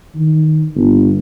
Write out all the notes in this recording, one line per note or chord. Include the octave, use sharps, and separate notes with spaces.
D#3
G1